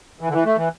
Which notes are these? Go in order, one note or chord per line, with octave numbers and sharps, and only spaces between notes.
E3
D3
E3
A3
E3